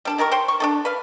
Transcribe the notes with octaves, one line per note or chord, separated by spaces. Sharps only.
G3 D4 A4
D#3 G4 A#4 C#6
C5 C#5 G5 C6
C#6
D4 D#4 A4
B4 F5